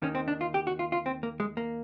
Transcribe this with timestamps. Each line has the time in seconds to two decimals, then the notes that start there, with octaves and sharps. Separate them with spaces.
0.02 D#2 D#3 C#4
0.15 C4
0.28 D4
0.41 F4
0.54 G4
0.67 F#4
0.79 F4
0.92 F4
1.06 C4
1.23 A#3
1.40 G#3
1.57 A#3